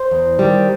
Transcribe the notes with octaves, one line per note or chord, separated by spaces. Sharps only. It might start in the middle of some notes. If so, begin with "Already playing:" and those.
Already playing: C5
E2
D#3 G3